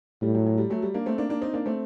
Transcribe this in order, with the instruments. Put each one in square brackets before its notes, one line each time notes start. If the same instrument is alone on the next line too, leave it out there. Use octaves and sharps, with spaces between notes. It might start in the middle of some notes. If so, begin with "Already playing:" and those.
[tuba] A2 [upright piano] G3
[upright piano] F#3
F#3
G3
F#3 A3
G3
A#3 D4
A3 C4
A#3 D4
A#3 D4
C4 D#4
A#3 D4
A3 C4